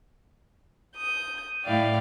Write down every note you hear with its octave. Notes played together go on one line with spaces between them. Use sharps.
D#6 G6
A2 E4 D5 F5 G5